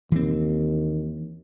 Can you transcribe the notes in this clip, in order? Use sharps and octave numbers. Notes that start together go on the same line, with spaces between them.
D#2 E3 C4